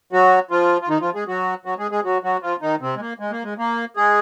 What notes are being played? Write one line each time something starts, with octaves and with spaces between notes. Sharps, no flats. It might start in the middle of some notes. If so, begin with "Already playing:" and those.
F#3 F#4
F3 F4
F4
D#3 D#4
F3 F4
G#3 G#4
F#3 F#4
F#3 F#4
G#3 G#4
G#3 G#4
F#3 F#4
F#3 F#4
F3 F4
D#3 D#4
C3 C4
G#3
A#3
G#3
A#3
G#3
A#3
G#3 G#4